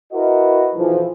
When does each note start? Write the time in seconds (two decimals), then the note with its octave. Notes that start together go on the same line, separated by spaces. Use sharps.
0.12 E4 F#4 A#4 B4 D#5
0.75 B1 E3 F3